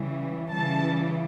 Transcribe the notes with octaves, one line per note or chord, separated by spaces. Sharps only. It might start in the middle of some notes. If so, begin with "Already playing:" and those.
Already playing: C#3 E3 G3
C#3 E3 G3 A5